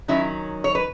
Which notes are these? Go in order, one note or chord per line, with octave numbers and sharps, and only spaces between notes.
D#3 F#3 C#4 E4
C#5
B4